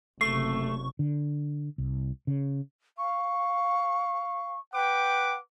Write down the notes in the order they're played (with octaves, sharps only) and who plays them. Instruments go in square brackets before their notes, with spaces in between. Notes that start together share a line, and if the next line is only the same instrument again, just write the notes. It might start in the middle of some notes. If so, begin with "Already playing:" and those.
[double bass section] F#1 C3 [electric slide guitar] A3 [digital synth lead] C#6 [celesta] C7
[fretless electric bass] D3
C2
C#3
[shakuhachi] F5 [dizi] C#6
[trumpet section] B4 F#5 D6 [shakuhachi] G5